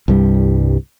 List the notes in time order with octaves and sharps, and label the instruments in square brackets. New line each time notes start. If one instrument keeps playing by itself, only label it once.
[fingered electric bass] C2 G2 G3